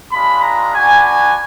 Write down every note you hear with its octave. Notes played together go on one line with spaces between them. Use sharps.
G#3 D4 F4 B5
A#5
B3 D4 F#4 G#5
G#5